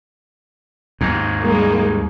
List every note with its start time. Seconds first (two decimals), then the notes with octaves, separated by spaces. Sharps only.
1.01 D#2 G#2
1.41 G3 G#3 A#3